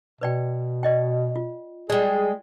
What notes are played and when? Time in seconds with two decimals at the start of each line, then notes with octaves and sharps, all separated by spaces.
0.21 B2 B4 D5 G5
0.83 D5 D#5 G5
1.36 F4
1.90 G3 G#3 G#4 D5